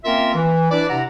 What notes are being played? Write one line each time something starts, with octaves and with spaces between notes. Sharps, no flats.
A#3 C4 C#4 F4 A#4 E5
E3
D4 E4 B4 D5
C3 E4 F#5 A#5